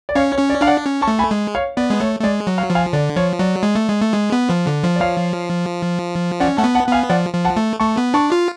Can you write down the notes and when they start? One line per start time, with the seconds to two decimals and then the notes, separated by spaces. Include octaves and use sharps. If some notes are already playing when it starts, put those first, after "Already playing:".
0.09 D5
0.15 C#4 C#5 F5
0.32 C#5
0.38 C#4
0.50 D5
0.61 D4 F5
0.67 D5 F#5
0.85 C#4
1.02 A5 C#6
1.08 A3
1.19 G#5 B5
1.31 G#3
1.55 C#5 F5
1.77 B3 D5
1.90 G#3
2.00 A3 C#5
2.20 A3
2.23 G#3 D5
2.47 F#3
2.58 C#5 F5
2.70 F3
2.75 F5 G#5
2.93 D3 D5
3.16 F3 C#5
3.39 F#3 D5
3.63 G#3
3.75 A3
3.88 G#3
4.00 A3
4.13 G#3
4.32 B3
4.50 F3
4.67 D3
4.84 F3
4.96 D5
5.01 C#5 F5
6.40 C#4 D5 F#5
6.57 A3 F#5 A5
6.64 B3
6.75 F#5 A5
6.85 B3 F#5
6.92 F5 G#5
7.09 F3 D5 F#5
7.34 F3
7.45 F#5 A5
7.56 A3
7.80 A3 A5 C#6
7.97 B3
8.14 D4 A5 C#6
8.32 F4